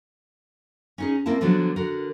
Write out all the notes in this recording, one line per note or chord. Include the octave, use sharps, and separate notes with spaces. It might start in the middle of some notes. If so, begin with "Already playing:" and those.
C#4 D#4 G#4
A#3 C4 E4 A5
D3 F3 F#3 B3 D4
D3 F#4 A#4